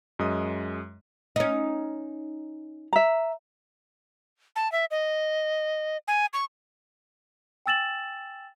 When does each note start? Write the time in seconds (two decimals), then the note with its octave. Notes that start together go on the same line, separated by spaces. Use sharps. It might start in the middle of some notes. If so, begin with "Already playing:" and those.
0.19 F#2 G#3 D#5 D#6
1.36 C#4 D#4
2.93 E5 A#5
4.56 A5
4.72 E5
4.91 D#5
6.08 G#5
6.33 C#6
7.66 G5 G#5 E6 A6 E7 F#7